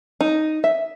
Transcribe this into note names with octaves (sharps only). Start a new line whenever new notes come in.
D#4
E5